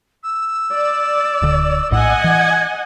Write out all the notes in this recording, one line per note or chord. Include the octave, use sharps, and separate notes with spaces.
E6
D5
D1 D3
A#1 A2 D#5 F#5 G#5 E6
E3 G#6